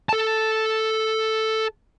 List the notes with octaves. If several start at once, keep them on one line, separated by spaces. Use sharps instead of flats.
A4 A5